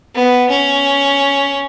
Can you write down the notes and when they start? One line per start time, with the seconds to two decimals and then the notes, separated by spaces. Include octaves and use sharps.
0.14 B3
0.50 C#4